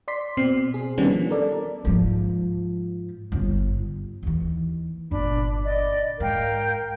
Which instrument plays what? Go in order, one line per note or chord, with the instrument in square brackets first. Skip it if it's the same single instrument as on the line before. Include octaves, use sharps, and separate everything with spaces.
[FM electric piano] D5 C6 B6
B2 C4 C7
G#4
D#3 G3 B3 C#4 D4
F3
A4 A#4 D5
[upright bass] G#2 F3
G1 G2
D#2 E3
[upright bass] G1 A#2 [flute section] D4 B5
[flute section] D5 D#5
[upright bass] G#2 [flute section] A#4 F5 G5